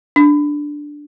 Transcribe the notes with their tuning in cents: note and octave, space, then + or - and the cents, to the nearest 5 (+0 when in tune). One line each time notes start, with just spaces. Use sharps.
D4 +0